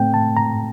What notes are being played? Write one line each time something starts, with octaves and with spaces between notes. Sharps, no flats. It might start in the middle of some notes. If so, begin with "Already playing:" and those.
Already playing: A2 A3 C4 G5
A5
A#5